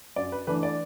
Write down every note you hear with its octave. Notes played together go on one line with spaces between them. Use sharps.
F#2 D5
B4
E3 A3 D4 B4
D5